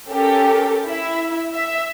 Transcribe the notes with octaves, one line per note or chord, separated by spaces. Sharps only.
C#4 G4 A4 A#4
E4 E5
E5